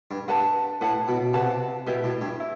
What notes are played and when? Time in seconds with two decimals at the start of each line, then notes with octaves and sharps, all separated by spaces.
0.11 G2
0.28 G2 B4 F#5 A5
0.81 A2 B4 F#5 A5
1.08 B2
1.34 C3 B4 F#5 A5
1.87 B2 E4 G4 B4
2.04 A2
2.21 G2
2.40 E4